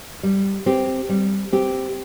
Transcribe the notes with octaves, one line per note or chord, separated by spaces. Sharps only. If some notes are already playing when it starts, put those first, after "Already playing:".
G3
C4 G4
G3
C4 G4